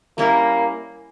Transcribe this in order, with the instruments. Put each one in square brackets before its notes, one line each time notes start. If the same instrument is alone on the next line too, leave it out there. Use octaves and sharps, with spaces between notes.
[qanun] G3 C#4 E4 A#4 [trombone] A#3